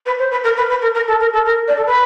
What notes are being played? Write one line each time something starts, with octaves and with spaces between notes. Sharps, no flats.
B4
C5
B4
A#4
B4
B4
A#4
A#4
A4
A#4
A4
A#4
D5
A4
B4